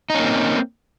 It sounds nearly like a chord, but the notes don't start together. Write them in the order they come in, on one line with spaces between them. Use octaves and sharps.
D#4 C#4 A#3 C4